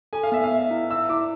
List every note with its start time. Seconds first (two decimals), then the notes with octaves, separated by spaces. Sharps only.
0.13 A4 G#5
0.23 F5
0.32 B3 E5
0.44 F5
0.51 E5
0.71 E4
0.91 E5 E6
1.09 E4 D6